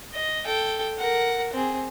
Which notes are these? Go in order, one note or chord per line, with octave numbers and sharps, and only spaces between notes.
D#5
A4 G5
A#4 F#5
C4 G#4